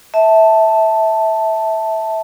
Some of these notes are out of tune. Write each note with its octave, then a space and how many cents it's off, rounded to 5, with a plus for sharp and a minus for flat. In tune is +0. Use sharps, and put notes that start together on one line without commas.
E5 -15 A5 +0